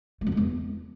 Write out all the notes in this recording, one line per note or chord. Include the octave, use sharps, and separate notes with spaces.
A3
F2
G#3
E2